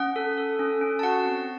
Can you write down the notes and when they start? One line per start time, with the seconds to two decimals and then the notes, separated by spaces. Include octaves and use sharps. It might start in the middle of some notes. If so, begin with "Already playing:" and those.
Already playing: C#4 F#5
0.16 A4
0.38 A4
0.59 C#4
0.81 C#4
0.99 A5
1.03 F#4 F#5
1.25 C4